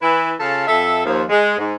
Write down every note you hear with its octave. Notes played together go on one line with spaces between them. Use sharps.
E3 E4 B4
C#3 F4 A4
F2 A4 E5
D#2 F3
G#3
G#2